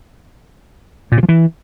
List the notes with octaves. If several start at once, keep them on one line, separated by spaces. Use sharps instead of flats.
A#2
C3
F3
E3